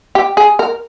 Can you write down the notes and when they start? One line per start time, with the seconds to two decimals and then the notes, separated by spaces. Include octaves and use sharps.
0.15 G4
0.37 G#4
0.59 A#4